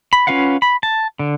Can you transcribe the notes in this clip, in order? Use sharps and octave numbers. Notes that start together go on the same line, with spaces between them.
B5
C#4 F4 B4 F5 F#5
B5
A5
D3